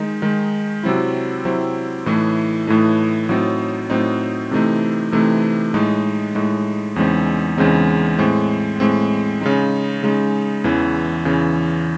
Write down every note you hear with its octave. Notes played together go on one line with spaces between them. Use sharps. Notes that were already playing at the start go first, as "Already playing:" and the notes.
Already playing: D#3 G#3 D#4
D#3 G#3 D#4
C3 F#3 C4 E4
C3 F#3 C4 E4
A2 E3 A3 D#4
A2 E3 A3 D#4
A2 F#3 C4 D#4
A2 F#3 C4 D#4
C3 E3 A3 C4 D#4
C3 E3 A3 C4 D#4
A2 G#3 D#4
A2 G#3 D#4
E2 C#3 G#3 C4 D#4
E2 C#3 G#3 C4 D#4
A2 G#3 C4
A2 G#3 C4
C#3 G#3 D#4
C#3 G#3 D#4
E2 C#3 E3
E2 C#3 E3